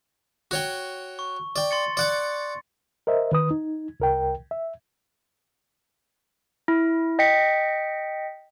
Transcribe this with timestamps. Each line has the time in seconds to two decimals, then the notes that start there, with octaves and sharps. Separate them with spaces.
0.51 F#4 C#5 G5
1.19 C#6
1.56 D5 G5
1.71 C6 A6 C#7
1.97 D5 F#5 D6
3.07 A#4 C5 D#5 E5
3.32 D#3 B4 D#6
3.51 D#4
4.00 C2 A#4 G5
4.51 E5
6.68 E4
7.19 D#5 G5 B6 C#7